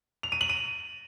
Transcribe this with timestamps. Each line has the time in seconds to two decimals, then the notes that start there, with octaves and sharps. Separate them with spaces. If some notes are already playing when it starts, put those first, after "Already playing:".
0.23 F7
0.32 D#7
0.41 F#7
0.49 D#7